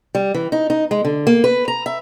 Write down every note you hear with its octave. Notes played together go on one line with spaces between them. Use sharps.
G3
E3
D#4
D#4
G#3
D3
A#3
B4
A#5
E5